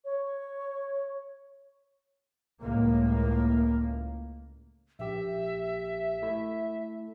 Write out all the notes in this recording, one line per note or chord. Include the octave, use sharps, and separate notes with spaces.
C#5
C#2 A2 A#3
A#1 G4 E5
A3 E4